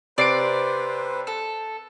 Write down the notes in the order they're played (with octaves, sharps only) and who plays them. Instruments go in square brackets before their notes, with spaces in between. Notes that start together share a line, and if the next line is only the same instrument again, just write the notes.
[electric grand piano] C3 C7 D7 [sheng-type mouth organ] B4 C5 [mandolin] D5
[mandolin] A4